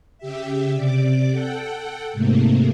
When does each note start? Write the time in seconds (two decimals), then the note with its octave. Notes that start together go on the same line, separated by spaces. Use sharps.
0.18 C#3 G4 E5
0.74 C3 D5 D6
1.32 A4 F#5 G5
2.13 G#2 C3 A3 A#3